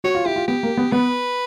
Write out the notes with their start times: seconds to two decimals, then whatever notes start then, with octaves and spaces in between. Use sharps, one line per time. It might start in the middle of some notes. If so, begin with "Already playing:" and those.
0.04 F#4 C#5
0.15 F4
0.26 E4 G4
0.36 F4
0.48 B3 G4
0.63 A#3
0.77 B3
0.92 B3 B4